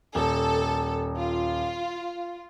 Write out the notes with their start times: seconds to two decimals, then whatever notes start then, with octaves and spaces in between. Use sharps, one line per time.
0.15 D#1 A4
1.18 F4